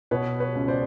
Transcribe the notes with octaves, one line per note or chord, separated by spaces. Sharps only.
B2 B4 C#5
B4 C#5
C#2
C5 D5